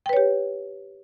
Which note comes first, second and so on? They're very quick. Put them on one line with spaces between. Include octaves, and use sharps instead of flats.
G5 B4 C#5 G4